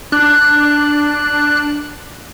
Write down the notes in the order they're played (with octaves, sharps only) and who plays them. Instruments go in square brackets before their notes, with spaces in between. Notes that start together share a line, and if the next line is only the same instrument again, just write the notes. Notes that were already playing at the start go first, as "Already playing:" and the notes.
[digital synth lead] D4 [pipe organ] F#6